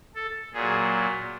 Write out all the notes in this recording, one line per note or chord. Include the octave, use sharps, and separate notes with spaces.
A4
A#2 F#3 G#4